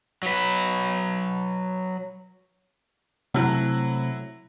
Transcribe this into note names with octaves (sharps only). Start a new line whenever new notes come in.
F#3 B4
C3 F#3 A3 C4 E4